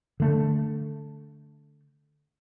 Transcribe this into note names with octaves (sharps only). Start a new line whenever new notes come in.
D3 A3